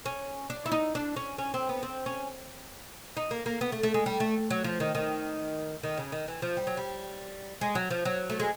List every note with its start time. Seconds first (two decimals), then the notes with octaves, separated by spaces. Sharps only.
0.06 C#4
0.50 D4
0.66 E4
0.72 D#4
0.95 D4
1.16 C#4
1.38 C#4
1.54 C4
1.69 B3
1.83 C4
2.06 C#4
3.17 D#4
3.31 A#3
3.46 A#3
3.61 B3
3.72 A3
3.83 A3
3.94 G#3
4.06 G3
4.20 A3
4.50 F#3
4.64 F3
4.80 D#3
4.95 D#3
5.83 D#3
5.97 C#3
6.12 D#3
6.28 E3
6.42 F3
6.57 G3
6.67 F#3
6.77 G3
7.61 G#3
7.75 F#3
7.90 F3
8.05 F#3
8.30 A3
8.40 G#3